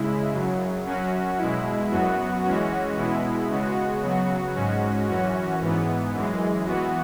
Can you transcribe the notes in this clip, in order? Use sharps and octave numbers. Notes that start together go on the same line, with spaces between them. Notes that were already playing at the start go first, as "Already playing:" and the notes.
Already playing: C#3 G#3 E4
F#2 C#3 F#3
F#2 F#3 C#4 F#4
B2 G#3 E4
F#2 F#3 B3 F#4
E3 G#3 C#4 F#4
B2 G#3 B3 E4
C#3 G#3 B3 F#4
C#3 F#3 B3 F#4
G#2 G#3 C#4 F#4
F#2 E3 C#4 F#4
G#2 E3 B3
F#2 E3 G#3
E3 B3 F#4